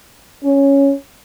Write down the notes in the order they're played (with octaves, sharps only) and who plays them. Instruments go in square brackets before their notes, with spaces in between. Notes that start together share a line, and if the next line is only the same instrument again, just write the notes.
[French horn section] C#4